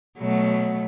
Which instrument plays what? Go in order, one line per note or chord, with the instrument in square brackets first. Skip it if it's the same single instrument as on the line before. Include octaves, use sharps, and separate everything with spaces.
[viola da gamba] B2 F#3 A3